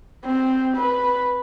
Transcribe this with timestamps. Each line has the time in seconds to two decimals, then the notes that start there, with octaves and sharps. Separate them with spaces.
0.24 C4
0.76 B4